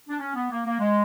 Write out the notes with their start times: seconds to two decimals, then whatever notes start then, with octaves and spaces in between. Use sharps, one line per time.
0.08 D4
0.19 C#4
0.35 B3
0.50 A#3
0.65 A#3
0.80 G#3